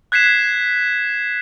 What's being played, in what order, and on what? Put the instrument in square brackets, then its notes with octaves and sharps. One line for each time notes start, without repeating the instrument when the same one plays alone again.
[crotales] F#6 G#6 B6 C7 E7